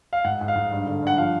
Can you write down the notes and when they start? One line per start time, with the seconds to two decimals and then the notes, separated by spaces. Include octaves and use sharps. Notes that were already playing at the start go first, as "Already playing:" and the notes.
0.13 F5
0.24 G#2 F#5
0.41 G#2
0.48 F5
0.55 G#2
0.71 G2
0.87 D3
1.02 G2 F#5
1.18 F3 F5